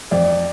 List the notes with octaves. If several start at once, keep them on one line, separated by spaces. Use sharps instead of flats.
F2 D5